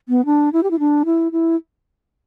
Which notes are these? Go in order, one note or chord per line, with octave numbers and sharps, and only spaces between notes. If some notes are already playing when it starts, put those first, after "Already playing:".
B3
D4
E4
G4
E4
D4
E4
E4